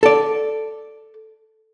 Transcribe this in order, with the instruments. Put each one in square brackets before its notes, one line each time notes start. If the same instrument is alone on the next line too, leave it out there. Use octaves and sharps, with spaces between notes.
[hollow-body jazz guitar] A4 D5